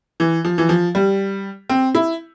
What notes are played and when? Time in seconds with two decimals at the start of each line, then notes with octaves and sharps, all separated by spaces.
0.20 E3
0.45 F3
0.58 E3
0.69 F3
0.95 G3
1.69 C4
1.95 E4